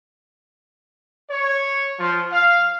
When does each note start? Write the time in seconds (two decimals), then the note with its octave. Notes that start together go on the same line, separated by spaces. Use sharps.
1.30 C#5
1.99 F3
2.32 F5